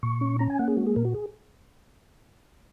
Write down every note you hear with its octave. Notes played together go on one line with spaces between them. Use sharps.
A#2 C#6
C#4
C#4 A#5
G#5
A#3 F#5
G#4
G#3 F#4
G#4
A#2 A#4
F#4
G#4